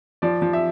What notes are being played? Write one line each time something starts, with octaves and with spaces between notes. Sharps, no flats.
F3 D5
F3
E5